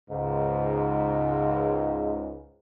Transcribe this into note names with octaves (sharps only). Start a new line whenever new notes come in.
C#2 G#2